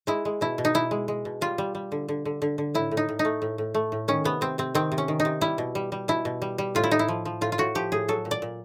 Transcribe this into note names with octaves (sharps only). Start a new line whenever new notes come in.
G#3 E4
G#3
B2 E4
B2
D#4
B2 E4
G#3
G#3
B2
G3 F4
G3
G3
D3
D3
D3
D3
D3
A2 E4
A2
D#4
A2
D#4
A3
A2
A2
A3
A2
D#3 C#4
C3 B3
C3 C4
C3 C4
D#3 C4
C3
C#4
D#3
D#4
C3
G3 E4
B2
G3
G3
B2 E4
B2
G3
G3
A2 F4
E4
A2 D#4
E4
F3
F3
A2 F4
F4
A2 F#4
F3 G4
A2 G#4
F#3 A4
A#2
D5
A#2